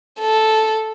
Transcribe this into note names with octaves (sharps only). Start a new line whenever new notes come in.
A4